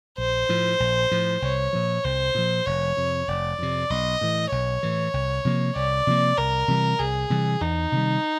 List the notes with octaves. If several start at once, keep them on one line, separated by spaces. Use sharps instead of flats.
A#1 C5
A2 F3
A#1
A2 F3
C2 C#5
A#2 F3
C2 C5
A#2 F3
F1 C#5
F2 C3
F1 D5
F2 C3
B1 D#5
A2 E3
B1 C#5
A2 E3
C2
C3 F3 A#3
C2 D5
C3 F3 A#3
C2 A#4
C3 E3 G3
C2 G#4
C3 E3 G3
E2 D#4
C3 D#3 G3